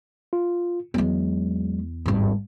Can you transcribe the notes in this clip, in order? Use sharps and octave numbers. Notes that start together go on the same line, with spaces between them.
F4
E2 F#3 G#3
G#1 G2